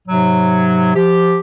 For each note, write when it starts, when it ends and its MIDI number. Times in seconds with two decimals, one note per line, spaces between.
0.08 0.96 44
0.08 0.96 48
0.08 0.96 54
0.96 1.38 53
0.96 1.38 67